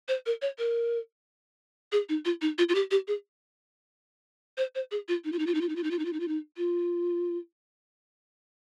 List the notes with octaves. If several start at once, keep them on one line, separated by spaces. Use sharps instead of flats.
C5
A#4
C#5
A#4
G#4
D#4
F4
D#4
F4
F4
G4
G4
G#4
C5
C5
G#4
F4
D#4
F4
D#4
F4
D#4
F4
D#4
F4
D#4
F4
D#4
F4
D#4
F4
D#4
F4